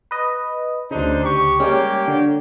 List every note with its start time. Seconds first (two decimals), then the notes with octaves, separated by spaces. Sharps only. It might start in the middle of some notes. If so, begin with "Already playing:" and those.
0.11 B4 D#5
0.91 D2 C#3 D4 D#4 C5
1.24 G4 C#6
1.60 G3 G#3 A#3 C#4 G4 C#5
2.08 D3